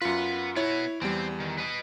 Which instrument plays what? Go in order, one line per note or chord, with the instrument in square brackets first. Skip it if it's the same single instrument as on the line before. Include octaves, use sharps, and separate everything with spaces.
[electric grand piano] F#2 F4 [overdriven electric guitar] B4 F#5
[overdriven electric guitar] B3 F#4 [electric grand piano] E4 C#5
[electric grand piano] E2 G3 [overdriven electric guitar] C4
[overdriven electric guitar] D#3
B4 D#5